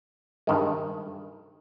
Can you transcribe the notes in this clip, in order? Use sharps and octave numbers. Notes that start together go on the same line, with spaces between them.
G2 D#3 G#3